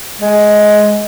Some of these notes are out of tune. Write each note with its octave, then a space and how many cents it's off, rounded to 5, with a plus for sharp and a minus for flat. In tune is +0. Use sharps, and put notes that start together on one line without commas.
G#3 +15